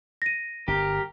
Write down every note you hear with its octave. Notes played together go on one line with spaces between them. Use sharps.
A#6 D#7
G1 G4 A#4